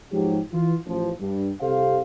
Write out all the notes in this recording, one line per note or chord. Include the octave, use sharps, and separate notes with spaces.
G#2 F3 F#3 G4
E3 F4
A1 F3
G2
C2 C3 G4 A4 C5 F5